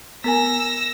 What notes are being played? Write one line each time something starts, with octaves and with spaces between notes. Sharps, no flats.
B3 A#4 G#5 E6 A#6